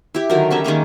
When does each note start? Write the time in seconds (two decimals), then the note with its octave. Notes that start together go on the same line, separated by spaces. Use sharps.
0.15 E4 G4
0.30 D3 D#3 F#3 A#4
0.51 G3 C#4 E5
0.64 D#3 G#3 A#3 A#5